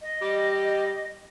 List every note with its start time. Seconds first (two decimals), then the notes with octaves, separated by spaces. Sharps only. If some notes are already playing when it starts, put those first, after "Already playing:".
0.02 D#5
0.22 G3 G4